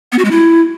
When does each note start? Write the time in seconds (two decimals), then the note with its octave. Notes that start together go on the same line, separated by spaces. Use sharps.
0.12 B3
0.18 F#4
0.25 G#3
0.31 E4